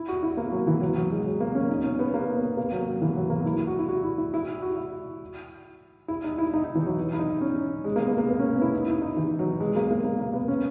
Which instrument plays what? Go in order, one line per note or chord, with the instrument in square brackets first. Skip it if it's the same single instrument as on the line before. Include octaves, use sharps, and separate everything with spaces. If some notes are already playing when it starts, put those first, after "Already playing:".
Already playing: [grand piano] E4
F#4
E4
A#3
F#3
E3
F#3
F#3
G#3
F#3
A#3
C#4
D#4
C#4
B3
A#3
B3
A#3
F#3
F#3
E3
F#3
A#3
E4
E4
F#4
E4
F#4
E4
E4
E4
F#4
E4
E4
D#4
E4
D#4
D#4
E3
F#3
E4
D#4
C#4
G#3
A#3
B3
A#3
B3
C#4
B3
E4
D#4
E4
D#4
E3
F#3
G#3
A#3
A#3
A#3
A#3
B3
C#4